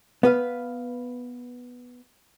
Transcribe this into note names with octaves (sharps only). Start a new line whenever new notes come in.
B3 B4 F5